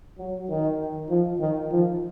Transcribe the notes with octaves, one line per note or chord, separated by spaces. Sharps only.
F#3
D#3
F3
D#3
F3